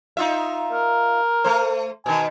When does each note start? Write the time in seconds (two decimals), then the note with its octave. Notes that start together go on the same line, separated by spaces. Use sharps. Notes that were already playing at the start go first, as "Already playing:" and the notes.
0.17 D#4 F4 E5
0.73 A#4
1.44 A3 C5
2.06 B2 D#3 G#5